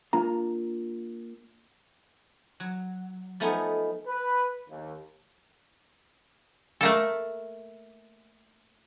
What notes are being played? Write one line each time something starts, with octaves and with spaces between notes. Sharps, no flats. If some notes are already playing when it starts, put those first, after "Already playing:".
A#3 D4 F4 A#5
F#3
F3 A3 B3 D#4 G#4
B4
D#2
A3 A#3 A4